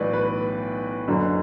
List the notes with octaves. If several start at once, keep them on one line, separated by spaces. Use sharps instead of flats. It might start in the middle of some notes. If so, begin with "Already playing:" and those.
Already playing: B1 A2 E3 B4 D5
B4
F#1 F#2 D3